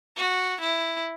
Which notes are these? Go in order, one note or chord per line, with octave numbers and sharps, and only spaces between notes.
F#4
E4